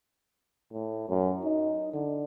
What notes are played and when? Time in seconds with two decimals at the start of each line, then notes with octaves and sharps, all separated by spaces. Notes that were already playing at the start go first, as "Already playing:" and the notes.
0.72 A2
1.08 F#2
1.44 D#4
1.93 D3